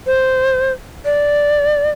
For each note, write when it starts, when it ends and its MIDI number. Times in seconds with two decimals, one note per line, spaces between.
0.06 0.72 72
1.05 1.90 74